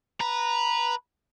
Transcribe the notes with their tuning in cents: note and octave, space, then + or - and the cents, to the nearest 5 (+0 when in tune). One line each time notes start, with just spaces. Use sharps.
B4 -10 A#5 +0